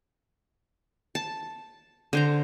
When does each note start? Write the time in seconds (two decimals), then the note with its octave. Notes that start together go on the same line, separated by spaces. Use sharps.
1.15 A5
2.13 D3 C5 A#5